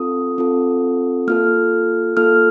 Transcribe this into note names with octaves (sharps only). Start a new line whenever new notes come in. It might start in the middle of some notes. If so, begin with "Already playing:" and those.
Already playing: C4 F4 A4 D#6
C4 F4 A4
A#3 F4 A4 F6
A#3 F4 A4 F6